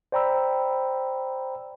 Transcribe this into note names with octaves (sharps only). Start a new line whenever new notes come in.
C5 D5 G5 A#5 B5 E6